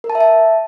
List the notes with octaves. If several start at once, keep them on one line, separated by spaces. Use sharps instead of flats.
A#4
A5
E5
A5